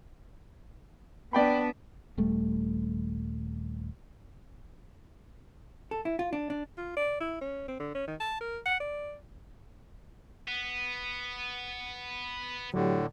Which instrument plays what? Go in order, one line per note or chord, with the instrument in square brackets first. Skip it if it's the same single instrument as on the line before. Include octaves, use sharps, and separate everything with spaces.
[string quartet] B3 D4 [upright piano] D5 G5 B5
[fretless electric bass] D#1 G3 A3
[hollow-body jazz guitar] A4
E4
F4
D4
D4
[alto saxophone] F4
D5
E4
C#4
C4
D3
C#4
D#3
A5
A#4
F#5
D5
[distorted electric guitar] B3
[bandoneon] A2 D3 [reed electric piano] F#3 G4